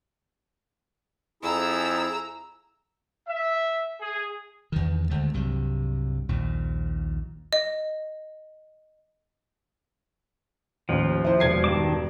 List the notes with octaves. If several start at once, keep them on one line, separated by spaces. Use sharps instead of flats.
F2 E4 G#4 A#5 E6
E5
G#4
E2 G2 D#3
D2 D3 G#3 A3
C2 G2 C3 F#3
A#1 D#2 A#2
D#5
A1 D#2 F3
E4 C5
E1 G#6 C7
G2 D#3 A5 D6